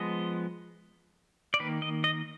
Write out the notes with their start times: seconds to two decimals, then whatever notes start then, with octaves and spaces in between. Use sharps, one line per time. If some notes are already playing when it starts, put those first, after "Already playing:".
Already playing: F3 G#3 B3 D#5
1.54 D5
1.60 D#3 A#3 B4
1.82 D#5
2.04 D#5